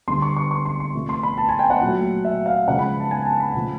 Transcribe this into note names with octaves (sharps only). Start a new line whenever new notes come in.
D3 G3 C6
C#6
C#6
C#6
C6
C6
C3 F3 A3
C6
B5
A5
G#5
G5
F#5
A#2 F#3 A3
E5
F5
C#3 F3 G#3 F#5
B5
A5
G#5
A5
B5
C#3 F3 A3